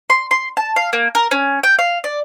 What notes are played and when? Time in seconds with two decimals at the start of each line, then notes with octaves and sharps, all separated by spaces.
0.10 C6
0.31 C6
0.57 A5
0.76 F5
0.93 A#3
1.15 A#4
1.31 C#4
1.63 G5
1.79 F5
2.04 D5